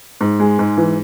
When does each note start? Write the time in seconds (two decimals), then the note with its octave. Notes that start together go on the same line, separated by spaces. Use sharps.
0.21 G#2
0.40 G#3
0.59 G#2
0.77 E3